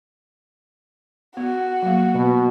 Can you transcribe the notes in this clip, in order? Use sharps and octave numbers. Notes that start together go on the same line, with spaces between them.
B3 F#4
F#3 A#3
B2